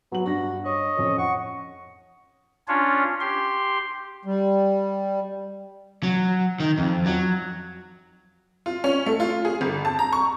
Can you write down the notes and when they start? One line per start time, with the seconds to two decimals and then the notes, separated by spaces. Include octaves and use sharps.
0.12 F#3 B3 F#7
0.26 G2 F#4 A#6
0.66 C#5 D#5
0.97 F2 C#4
1.18 F#5 C#6
2.68 C#4 D4 F4 C#5
3.20 G4 C6
4.25 G3
6.03 F#3
6.60 D#3
6.78 F2
7.06 F#3
8.66 F4
8.84 C#4
9.06 A3
9.20 F4
9.45 G#4
9.61 G1
9.85 A5
9.99 A#5
10.13 C#6